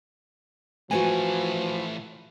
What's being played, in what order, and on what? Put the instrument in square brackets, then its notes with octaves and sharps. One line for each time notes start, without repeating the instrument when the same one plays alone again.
[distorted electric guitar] A2 E3 [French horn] F3 [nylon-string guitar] F#4 B4 G#5